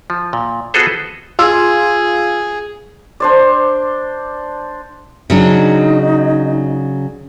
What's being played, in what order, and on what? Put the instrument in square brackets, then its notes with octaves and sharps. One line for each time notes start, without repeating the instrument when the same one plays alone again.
[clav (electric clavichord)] F3
A#2
B3 F4 F#4 G#4 A4 C5
[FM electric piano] F4 [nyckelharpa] G#4 [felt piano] E6
[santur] D4 C5 D5
[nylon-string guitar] C#3 F#3 D4 [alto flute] D#4